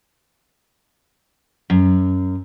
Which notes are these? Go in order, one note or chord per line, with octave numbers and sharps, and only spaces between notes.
F#2